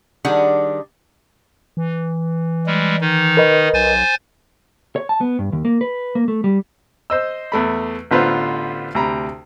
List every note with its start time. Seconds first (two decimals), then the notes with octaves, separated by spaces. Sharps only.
0.25 D#3 G3 D4 G#4 F#5
1.77 E3
2.66 G3 G#3
3.01 D#3 D#4
3.37 A#4 B4 D#5
3.74 B1 C5 G#5 A6
4.96 C#5
5.09 A5
5.21 B3
5.39 G2
5.52 D#2
5.65 A#3
5.81 B4
6.15 A#3
6.28 A3
6.44 G3
7.10 C5 D#5 E6
7.52 E2 A3 B5
8.11 A1 D3 B3 F4 B4 C5
8.95 D2 C3 A#5 B5